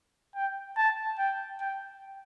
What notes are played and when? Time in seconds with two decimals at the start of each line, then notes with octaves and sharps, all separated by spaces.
0.35 G5
0.77 A5
1.18 G5
1.61 G5